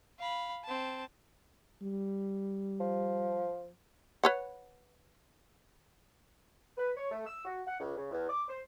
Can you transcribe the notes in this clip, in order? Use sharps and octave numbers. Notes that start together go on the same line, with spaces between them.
F5 B5
C4 A5
G3
F3
B4 C#5 F#5
B4
C#5
A3
E6
F#4
F#5
C#2
C#3
E2
D6
C5